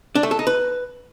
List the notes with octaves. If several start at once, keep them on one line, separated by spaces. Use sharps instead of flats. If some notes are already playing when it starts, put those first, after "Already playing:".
D4
A3
A4
D#4
B4